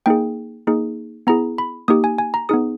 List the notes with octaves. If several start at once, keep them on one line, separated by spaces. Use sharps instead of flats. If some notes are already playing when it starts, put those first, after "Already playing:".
A#3 D#4 G#4 G5
A#3 D#4 G#4
B3 E4 G#4 A#5
B5
A#3 D#4 G4 D#6
G#5
G#5
A#5
B3 D#4 G#4 D#6